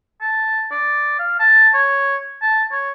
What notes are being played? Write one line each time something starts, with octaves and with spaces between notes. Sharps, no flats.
A5
D5
F5
A5
C#5
A5
C#5